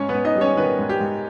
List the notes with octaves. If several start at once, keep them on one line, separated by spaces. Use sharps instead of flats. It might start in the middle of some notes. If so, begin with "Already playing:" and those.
Already playing: G#2 C#4 C#5
B3 B4
G#2
D#4 D#5
G3
C#4 C#5
D#3 B3 B4
G#2
G4
G#2